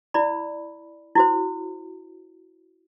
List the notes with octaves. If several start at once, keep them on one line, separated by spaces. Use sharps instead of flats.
E4 D5 B5
E4 F#4 C5